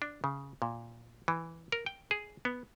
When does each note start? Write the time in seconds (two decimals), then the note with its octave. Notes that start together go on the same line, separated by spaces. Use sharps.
0.02 D4
0.24 C#3
0.62 A#2
1.28 E3
1.72 A#4
1.86 G5
2.11 G#4
2.45 B3